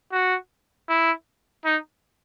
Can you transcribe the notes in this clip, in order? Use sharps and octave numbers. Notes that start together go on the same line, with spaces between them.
F#4
E4
D#4